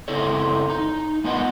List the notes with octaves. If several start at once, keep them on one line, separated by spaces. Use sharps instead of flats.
F#2 C#3 C4 E4 A4 C#5
D#4
A#3 B3 F4 B4 D#5 F#5